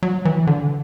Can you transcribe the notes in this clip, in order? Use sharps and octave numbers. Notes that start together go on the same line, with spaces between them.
F#3
E3
D3